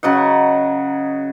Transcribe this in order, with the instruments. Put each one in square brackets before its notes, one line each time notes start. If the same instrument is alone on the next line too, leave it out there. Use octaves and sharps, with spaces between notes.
[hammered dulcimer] C#3 F#3 D#5 F#5